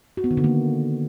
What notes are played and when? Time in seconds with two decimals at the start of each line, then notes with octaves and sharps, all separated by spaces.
0.17 F#4
0.24 B3
0.31 D#3
0.37 D3
0.44 A#3